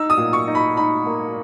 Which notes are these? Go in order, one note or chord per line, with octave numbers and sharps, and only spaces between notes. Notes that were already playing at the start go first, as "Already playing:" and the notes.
Already playing: D#4 E6
D#6
A#2
C#6
D#4
B5
D#4 B5
A#3